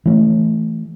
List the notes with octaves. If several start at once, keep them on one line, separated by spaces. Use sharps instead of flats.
E3 A3